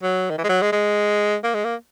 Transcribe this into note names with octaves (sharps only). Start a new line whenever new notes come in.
F#3
D#3
E3
G#3
F#3
G#3
G#3
A#3
G#3
A#3